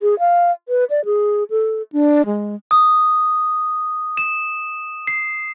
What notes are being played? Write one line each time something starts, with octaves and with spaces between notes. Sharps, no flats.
G#4
F5
B4
D5
G#4
A4
D4
G#3
D#6
E7
C7